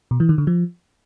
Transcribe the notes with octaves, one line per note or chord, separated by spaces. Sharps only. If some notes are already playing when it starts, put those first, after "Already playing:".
B2
E3
D#3
D3
F3